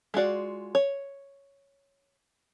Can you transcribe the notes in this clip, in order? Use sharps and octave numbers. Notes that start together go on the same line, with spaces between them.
G#3 F4 F#4 D5
C#5